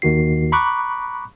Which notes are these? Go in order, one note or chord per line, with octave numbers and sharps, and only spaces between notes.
D#2 D#3 F#4 C7
A#5 B5 C#6 D6 F#6